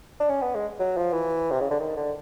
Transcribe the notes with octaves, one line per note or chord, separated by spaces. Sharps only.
D4
C#4
B3
G#3
F#3
F3
E3
C3
C#3
D3
D#3
D3